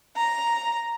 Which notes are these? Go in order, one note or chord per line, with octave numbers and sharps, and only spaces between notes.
A#5